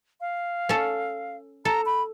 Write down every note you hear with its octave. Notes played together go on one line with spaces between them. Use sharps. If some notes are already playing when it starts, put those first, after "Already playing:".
F5
C#4 A4
A4 A#5
B5